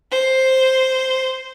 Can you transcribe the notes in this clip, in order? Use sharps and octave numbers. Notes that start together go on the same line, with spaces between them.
C5